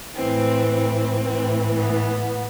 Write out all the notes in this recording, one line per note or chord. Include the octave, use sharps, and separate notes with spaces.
A2 E3 C4
C4
A2 E3
B3